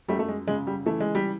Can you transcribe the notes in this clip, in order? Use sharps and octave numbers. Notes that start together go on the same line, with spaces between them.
F#2 G3 A3
A3
G#3
C#3 G#3
G3
E3 A3
G#3
G3